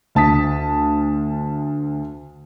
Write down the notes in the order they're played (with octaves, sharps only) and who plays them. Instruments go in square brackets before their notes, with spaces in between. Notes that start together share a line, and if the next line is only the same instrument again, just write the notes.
[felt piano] D2 A5 D#6 B6